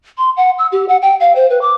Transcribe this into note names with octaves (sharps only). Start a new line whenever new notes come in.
C6
F#5
E6
G4
F#5
G5
F5
C5
B4
D6